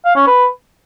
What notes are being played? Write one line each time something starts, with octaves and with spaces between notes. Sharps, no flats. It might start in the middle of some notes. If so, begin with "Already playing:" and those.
F5
C#4
B4